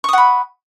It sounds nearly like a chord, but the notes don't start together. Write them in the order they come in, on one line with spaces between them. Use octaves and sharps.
C#6 D#6 F#5 B5